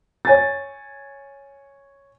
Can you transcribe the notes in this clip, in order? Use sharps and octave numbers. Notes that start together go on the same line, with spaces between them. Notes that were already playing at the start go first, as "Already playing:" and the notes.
C#5 G#5 A6